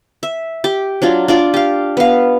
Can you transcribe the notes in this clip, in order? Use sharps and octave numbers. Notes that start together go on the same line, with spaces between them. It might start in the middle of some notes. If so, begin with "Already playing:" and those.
E5
G4
F#3 D4 F4
D4 F4 D5
G4 F5
B3 F5